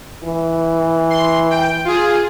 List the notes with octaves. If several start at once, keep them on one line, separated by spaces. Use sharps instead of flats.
E3
C6
G5
F4 G#4